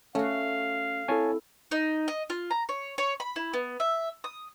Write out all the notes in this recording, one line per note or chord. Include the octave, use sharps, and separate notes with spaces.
A3 C#4 F#4 F5
C4 E4 A4 C#5 G#5 A5
D#4
D#5
F4
A#5
C#5
C#5
B5
E4
B3
E5
D#6